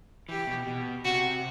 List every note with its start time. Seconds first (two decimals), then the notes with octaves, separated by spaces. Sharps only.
0.29 E3 G4
0.47 B2
0.67 B2
1.04 C3 F#4